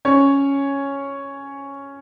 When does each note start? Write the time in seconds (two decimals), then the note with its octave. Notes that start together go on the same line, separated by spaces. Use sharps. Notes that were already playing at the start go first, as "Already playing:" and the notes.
0.05 C#4 C#5